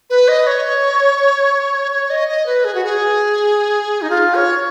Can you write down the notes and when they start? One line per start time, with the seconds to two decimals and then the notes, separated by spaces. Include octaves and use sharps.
0.10 B4
0.28 D#5
0.47 C#5
1.92 C#5
2.10 D#5
2.29 D#5
2.46 B4
2.65 G#4
2.75 F#4
2.84 G#4
4.02 D#4
4.10 F4
4.35 C#5